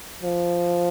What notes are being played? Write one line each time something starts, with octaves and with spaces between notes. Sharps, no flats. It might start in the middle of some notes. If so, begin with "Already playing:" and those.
F3